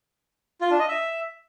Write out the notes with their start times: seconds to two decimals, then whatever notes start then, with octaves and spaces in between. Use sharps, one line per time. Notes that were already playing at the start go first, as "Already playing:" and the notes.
0.61 F4
0.70 D4
0.79 D#5
0.88 E5